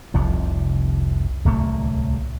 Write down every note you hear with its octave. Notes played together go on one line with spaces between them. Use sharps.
F1 C2 C3 F3
D1 C2 A3 A#3